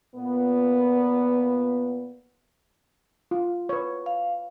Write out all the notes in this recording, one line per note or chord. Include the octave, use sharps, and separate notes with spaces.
A#2 B3
F4
B4 C#5
F5